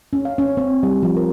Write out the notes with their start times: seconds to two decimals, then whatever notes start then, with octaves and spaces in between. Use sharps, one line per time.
0.13 C#4
0.25 F5
0.38 C#4
0.57 C4
0.83 G3
1.03 F3
1.16 A#4